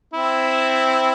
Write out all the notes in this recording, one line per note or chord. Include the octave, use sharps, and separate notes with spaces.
C4 E4